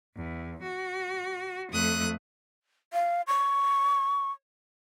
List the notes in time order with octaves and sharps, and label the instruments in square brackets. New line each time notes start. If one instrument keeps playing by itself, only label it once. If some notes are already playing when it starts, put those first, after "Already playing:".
[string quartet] E2
F#4
F2 A3 D#6 F#6
[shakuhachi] F5
C#6